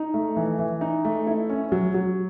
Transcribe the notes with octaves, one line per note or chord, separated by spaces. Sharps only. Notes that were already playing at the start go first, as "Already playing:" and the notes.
Already playing: D#4
A3
E3
E3
D#4
A3
E4
C#4
F#3
F#3